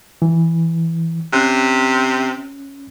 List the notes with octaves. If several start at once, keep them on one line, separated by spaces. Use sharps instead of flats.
E3
C3 C#4 F#6